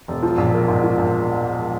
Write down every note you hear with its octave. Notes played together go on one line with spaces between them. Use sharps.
E1
F3
A#1
A#3
G#2
F3
A#1